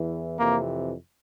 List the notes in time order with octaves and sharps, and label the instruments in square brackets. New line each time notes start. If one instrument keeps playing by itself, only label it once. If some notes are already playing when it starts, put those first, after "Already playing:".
Already playing: [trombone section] E2 E3
F2 C3 E3 A#3